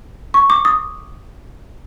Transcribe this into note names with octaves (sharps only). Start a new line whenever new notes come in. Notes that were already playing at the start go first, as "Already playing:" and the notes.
C#6
D6
D#6